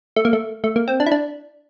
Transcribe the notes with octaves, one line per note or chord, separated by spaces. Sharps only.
A3
A#3
A3
A3
A#3
C4
D4
E4
D4